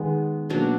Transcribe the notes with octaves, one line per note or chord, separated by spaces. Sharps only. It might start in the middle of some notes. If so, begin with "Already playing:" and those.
Already playing: D#3 G#3 B3
B2 F#3 A#3 D4